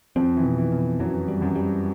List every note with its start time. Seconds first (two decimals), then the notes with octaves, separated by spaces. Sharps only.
0.16 F2 F3 C4
0.37 E3
0.44 B2
0.58 E3
0.72 B2
0.99 F#2 E3 F#3
1.28 G3
1.41 F#2 F#3
1.56 G3